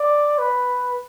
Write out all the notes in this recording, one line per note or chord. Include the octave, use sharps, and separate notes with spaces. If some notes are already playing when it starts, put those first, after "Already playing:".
Already playing: D5
B4